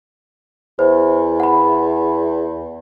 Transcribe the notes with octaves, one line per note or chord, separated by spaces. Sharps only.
E2 C5
F#5 B5